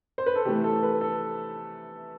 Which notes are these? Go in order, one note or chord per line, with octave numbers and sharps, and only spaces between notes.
C5
B4
A4
C3 E3 A3 G4
A4
B4
A4